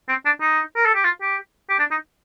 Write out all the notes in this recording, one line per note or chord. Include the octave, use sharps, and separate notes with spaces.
C4
D4
D#4
A#4
A4
G4
F4
G4
G4
D4
D#4